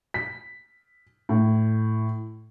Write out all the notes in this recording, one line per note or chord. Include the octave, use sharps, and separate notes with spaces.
B6
A2